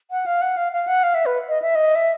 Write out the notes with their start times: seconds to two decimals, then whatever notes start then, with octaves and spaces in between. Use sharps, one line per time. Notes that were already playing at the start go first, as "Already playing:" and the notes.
0.11 F#5
0.26 F5
0.42 F#5
0.57 F5
0.72 F5
0.87 F#5
1.03 F5
1.14 E5
1.26 B4
1.49 D#5
1.62 E5
1.75 D#5
1.95 E5